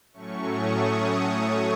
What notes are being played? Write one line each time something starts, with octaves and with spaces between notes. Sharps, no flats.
A2 F#3 A3 C#4 C#6
D#6